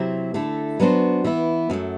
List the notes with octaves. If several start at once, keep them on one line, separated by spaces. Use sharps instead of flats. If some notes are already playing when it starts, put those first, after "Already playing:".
Already playing: C3 F#3 C4 E4
D3 A3 E4 A4
F#3 B3 D4 F#4 C5
E3 B3 E4
F#2 F#3 A3